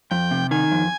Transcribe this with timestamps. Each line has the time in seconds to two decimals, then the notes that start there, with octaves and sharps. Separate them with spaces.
0.11 F2 G5
0.31 C3
0.51 D#3 G#5
0.72 F2